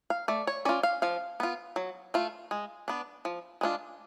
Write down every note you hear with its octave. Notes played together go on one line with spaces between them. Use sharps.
F5
A3 D5
C#5
C#4 F4 D5
F5
F3 F5
B3 F4
F#3
A3 F4
G#3
B3 D4
F3
G#3 D4 F4